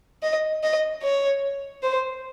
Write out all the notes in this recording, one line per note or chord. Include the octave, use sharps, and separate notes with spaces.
D#5
D#5
C#5
C5